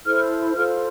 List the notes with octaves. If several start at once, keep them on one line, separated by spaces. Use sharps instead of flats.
E4 A4 C5 F6
F4 A4 C5 F6